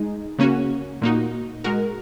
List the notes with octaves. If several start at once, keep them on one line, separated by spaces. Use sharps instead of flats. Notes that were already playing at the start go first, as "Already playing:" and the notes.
Already playing: G#3 D#4 G#4
C#3 A#3 C#4 F#4
A#2 A#3 D#4 F#4
G#3 F#4 A#4